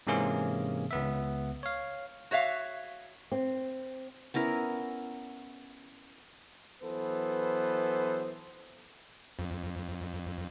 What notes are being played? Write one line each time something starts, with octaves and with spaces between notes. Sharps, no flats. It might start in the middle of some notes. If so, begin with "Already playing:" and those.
G#2 C3 E3 A#3 C#4 G#4
C#2 B3 E5
C#5 F5
F#4 C#5 E5 F5
C4
B3 C#4 E4 A#4
E3 F#3 B3 A4 C5
F2